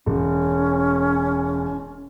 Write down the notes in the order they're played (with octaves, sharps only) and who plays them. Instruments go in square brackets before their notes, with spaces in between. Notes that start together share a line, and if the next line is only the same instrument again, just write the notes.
[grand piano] E1 [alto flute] C#4